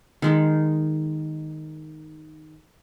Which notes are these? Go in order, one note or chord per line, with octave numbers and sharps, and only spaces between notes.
D#3 G#3 D#4